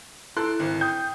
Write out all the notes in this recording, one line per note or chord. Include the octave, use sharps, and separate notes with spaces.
E4 A4 C6 F#6
G#1
G5 D#6 G6